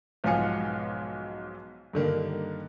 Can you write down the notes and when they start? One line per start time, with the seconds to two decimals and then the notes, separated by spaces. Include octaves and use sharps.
0.24 B1 G#2 F3 F5 G#5 C#7
1.93 G2 D3 D#3 A#3